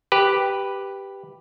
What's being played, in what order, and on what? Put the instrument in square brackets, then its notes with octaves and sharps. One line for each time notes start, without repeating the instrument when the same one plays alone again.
[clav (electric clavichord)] G4 B4